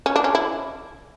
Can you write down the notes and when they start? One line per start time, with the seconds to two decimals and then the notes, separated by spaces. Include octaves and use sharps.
0.06 C#4
0.16 D4
0.24 C#4
0.35 E4